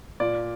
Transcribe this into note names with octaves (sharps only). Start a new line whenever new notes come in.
A#2 D5